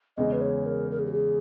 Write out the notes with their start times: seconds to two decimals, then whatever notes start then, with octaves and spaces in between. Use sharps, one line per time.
0.17 E2 C#3 G#3 D#5
0.33 B4
0.41 C#5
0.66 A#4
0.91 A#4
0.99 G#4
1.06 G4
1.13 G#4